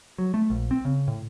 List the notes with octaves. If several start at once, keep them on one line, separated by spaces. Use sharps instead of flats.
F#3
A3
A#1
C4
C#3
A2